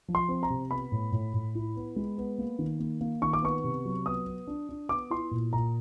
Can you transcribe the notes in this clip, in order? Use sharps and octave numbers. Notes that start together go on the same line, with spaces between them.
F3
C6
C4
A#5
C3
B3 B5
A2
A2
A2
E4
B3
G#3
B3
A#3
D#3
A#3
A#3
D#3 C#6
D6
B3 C#6
C3
F#3
B3 D#6
B3
D4
D4
B3 D6
E4 C6
A#2
A#2 A#5